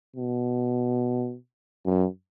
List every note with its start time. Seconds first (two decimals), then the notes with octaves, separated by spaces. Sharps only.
0.16 B2
1.86 F#2